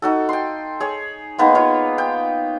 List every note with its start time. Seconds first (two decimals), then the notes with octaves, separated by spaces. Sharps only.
0.02 D#4 F#4 A4
0.29 G5 C6
0.80 G#4 C#5
1.38 G#3 A#3 B3 D#4
1.55 F4 C#5
1.98 G5